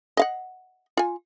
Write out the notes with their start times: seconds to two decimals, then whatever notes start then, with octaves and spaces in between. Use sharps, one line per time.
0.17 D#5 F5 F#5
0.97 F4 G#5